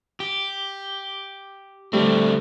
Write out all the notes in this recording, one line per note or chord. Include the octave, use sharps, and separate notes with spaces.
G4
D3 G3 A3 C4